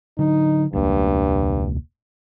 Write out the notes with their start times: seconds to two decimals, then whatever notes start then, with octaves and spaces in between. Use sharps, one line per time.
0.19 D3 F#3 D#4
0.73 E1 C#2 G2 A#3